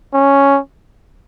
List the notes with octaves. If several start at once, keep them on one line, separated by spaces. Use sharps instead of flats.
C#4